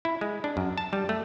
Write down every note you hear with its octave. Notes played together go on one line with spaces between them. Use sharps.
E4
G#3
D4
F#2
A5
G3
A3